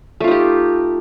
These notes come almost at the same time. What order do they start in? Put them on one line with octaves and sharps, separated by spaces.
A3 F4 D#4 G4